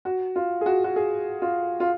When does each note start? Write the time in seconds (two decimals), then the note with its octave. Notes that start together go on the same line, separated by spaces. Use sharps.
0.05 F#4
0.36 F4
0.61 G#4
0.66 F#4
0.84 F#4
0.96 G#4
1.42 F4
1.80 F4